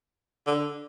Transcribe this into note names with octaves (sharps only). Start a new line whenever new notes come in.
D3